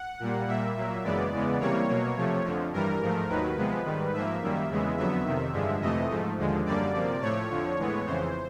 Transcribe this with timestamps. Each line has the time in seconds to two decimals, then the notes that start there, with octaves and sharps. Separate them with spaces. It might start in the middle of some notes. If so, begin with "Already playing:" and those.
Already playing: F#5
0.20 A#2 G3 A#3
0.47 A#2 G3 A#3 E5
0.76 A#2 F#3 A#3
1.04 F#2 C#3 E3 G#3 B3 D5
1.32 E2 C#3 E3 G#3 B3
1.60 C3 E3 G3 A#3 C#5
1.88 B2 F#3 A#3
2.16 C3 F3 A3
2.44 F2 D3 F3
2.72 G2 E3 G3 A#4
3.01 G#2 F3 A3
3.29 D#2 D#3 F#3 B4
3.57 C3 F3 G#3 B3
3.85 G#2 D#3 G3
4.13 G#2 F3 A#3 E5
4.41 F#2 D#3 G3 A#3
4.69 E2 C#3 E3 G#3 B3
4.97 F2 D3 F#3 B3 E5
5.25 F2 C3 D#3
5.53 G2 D3 F3 G#3
5.82 F2 C3 E3 A3 D#5
6.10 G#2 F3 A3
6.38 D#2 D3 F3 G#3
6.65 F#2 D3 G3 A#3 D5
6.93 C3 F3 A#3
7.21 A2 F3 A3 C#5
7.50 F2 D3 F3
7.78 A2 E3 G#3 B3
8.06 F2 C#3 E3 C5